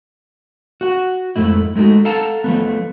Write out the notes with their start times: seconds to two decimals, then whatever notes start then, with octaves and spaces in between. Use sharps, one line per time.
0.81 F#4 F#5
1.36 F2 G#2 A3 E4
1.76 G#3 A3 D#4 F#4
2.05 A4 F5 F#5 A5 A#5
2.44 F3 A3 B3